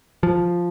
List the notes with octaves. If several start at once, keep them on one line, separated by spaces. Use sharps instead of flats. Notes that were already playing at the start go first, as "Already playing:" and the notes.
F3